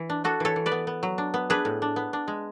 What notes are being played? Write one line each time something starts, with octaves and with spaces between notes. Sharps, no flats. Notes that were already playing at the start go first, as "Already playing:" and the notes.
Already playing: E3
D4
D4 F#4 A4
E3 A4 C#5
E3
B4 D5
B3
B3
F#3
D4
B3
D4 G#4 B4
A2
D4
B3
D4
G#3